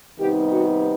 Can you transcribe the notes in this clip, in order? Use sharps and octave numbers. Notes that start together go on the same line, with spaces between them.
C3 D#3 G3 B3 D#4 G4
F#4